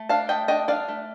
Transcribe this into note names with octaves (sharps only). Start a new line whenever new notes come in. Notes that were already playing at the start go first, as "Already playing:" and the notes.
Already playing: A3
D4 F5 A5
A3 D#5 G5
D4 D#5 G5
D4 D5 F5
A3